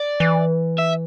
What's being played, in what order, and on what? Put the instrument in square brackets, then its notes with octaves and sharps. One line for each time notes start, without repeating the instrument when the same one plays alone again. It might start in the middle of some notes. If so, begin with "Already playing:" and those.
Already playing: [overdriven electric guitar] D5
[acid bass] E3
[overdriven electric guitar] E5